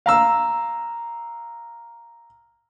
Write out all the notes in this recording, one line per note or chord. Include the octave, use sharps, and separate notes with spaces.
F5 A#5 E6